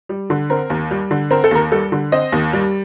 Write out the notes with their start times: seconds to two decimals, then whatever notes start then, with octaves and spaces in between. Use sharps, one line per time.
0.09 G3
0.30 D3
0.50 C4 A#4
0.70 D#2
0.91 G3
1.11 D3
1.31 C4 A#4
1.44 A4
1.51 D#2 A#4
1.72 G3 A4
1.92 D3
2.12 C4 D#5
2.32 D#2
2.53 G3